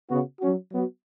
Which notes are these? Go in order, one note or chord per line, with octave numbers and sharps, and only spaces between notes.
C#3 B3 F#4
F#3 C#4 F#4
F#3 B3 F#4